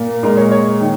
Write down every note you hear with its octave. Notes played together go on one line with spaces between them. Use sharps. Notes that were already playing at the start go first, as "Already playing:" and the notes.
Already playing: A#2 A#3
A#2 G#3 A#4
C#5
C#5
D#3